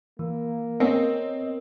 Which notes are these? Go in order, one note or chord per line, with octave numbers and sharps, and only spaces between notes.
E3 A#3
B3 C4 A#4 C#5 D#5